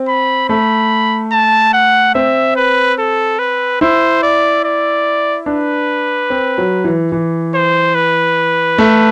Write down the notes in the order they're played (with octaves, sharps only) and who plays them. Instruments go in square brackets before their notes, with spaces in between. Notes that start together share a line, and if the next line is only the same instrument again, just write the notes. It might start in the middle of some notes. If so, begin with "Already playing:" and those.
Already playing: [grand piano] C4
[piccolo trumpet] B5
[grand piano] A3 [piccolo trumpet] B5
[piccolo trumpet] A5
F#5
[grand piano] C4 [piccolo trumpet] E5
[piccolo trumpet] B4
A4
B4
[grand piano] E4 [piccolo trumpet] C5
[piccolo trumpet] D5
D5
[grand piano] D4 [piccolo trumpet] B4
[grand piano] C4
F#3
E3
E3
[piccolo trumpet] C5
B4
[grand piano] A3